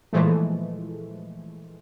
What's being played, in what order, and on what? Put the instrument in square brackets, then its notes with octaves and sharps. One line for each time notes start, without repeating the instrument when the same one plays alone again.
[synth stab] A#2 E3 F3 G#3 A3